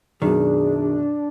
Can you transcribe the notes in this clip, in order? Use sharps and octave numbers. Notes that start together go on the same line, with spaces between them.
F#2 B2 D#3 D4 G#4